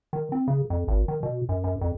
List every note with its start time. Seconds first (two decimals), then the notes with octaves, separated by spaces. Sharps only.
0.13 D#3
0.32 C4
0.48 C#3
0.70 F2
0.88 G#1
1.08 D#3
1.23 B2
1.49 F#2
1.64 F#2
1.81 F2